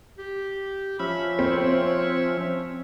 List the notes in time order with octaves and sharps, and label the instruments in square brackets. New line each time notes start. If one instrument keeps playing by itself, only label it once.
[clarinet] G4
[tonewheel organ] F3 C#4 E5 [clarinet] B5
[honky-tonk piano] C4 [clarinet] C#5